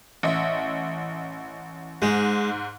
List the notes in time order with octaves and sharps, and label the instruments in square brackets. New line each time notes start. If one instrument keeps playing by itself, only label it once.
[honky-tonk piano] A1 D#5 E5
[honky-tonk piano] G#2 [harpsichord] G#3